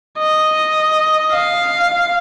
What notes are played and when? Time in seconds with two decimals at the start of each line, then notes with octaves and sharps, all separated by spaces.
0.19 D#5
1.33 F5